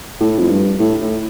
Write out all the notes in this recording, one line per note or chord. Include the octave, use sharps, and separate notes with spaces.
A2
F2
G2
A2
A2